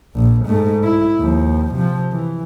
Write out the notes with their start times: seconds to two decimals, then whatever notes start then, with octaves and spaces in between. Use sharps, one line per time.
0.15 A#1
0.46 G#2 A3
0.84 E4
1.20 D#2 F3
1.74 C3 F3
2.12 E3